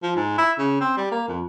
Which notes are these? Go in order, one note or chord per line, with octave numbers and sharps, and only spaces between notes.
F3
G#2
E4
C#3
C4
G3
A#3
F2